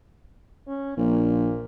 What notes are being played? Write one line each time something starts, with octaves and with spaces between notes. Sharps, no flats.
C#4
A#1 A#2